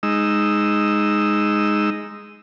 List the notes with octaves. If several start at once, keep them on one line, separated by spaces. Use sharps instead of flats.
G#3 D#4 E6